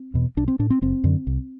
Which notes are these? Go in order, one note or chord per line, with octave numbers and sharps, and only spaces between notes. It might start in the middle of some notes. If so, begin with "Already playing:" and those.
Already playing: C4
E2 B2
B1 D4
C4
A2 D4
C4
F#1 C4
F#2 D3
C2